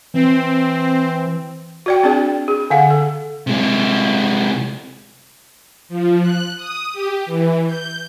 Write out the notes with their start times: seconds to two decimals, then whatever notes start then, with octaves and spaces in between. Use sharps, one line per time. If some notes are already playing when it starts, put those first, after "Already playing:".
0.14 E3 C4
1.86 F#4 D5 G5
2.03 C4 D4 G#4 D5
2.48 G#4
2.70 D3 F5 F#5
2.90 A4
3.47 C3 G#3
5.89 F3
6.21 F#6
6.56 D#6
6.93 G4
7.26 E3
7.67 G6